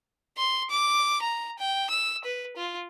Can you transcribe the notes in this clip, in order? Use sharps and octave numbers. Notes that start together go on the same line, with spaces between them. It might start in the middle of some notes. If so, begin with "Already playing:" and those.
C6
D6
A#5
G5
E6
B4
F4